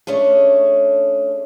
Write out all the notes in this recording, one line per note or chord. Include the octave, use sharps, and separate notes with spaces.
A3 C#4 D4 G#4